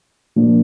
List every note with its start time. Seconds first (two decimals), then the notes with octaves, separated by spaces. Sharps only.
0.36 A#2 F3 A#3 D4